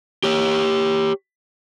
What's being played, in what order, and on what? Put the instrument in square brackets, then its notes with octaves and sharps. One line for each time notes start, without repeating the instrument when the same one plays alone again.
[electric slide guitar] G4 C#5